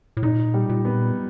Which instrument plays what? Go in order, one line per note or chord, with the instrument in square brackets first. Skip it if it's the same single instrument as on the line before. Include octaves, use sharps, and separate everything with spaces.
[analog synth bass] A2
[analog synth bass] A#2 [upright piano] D#4
[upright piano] G3
[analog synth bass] A#2
[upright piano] B3